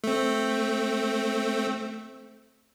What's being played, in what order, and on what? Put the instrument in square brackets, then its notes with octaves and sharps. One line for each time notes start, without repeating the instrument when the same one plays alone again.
[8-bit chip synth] A3 C4